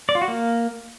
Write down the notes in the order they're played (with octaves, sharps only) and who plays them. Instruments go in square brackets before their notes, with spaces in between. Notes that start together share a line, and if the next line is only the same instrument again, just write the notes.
[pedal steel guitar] D5
F4
F#4
A#3